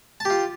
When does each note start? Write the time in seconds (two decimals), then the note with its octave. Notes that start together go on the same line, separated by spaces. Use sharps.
0.20 A5
0.25 G4
0.30 F4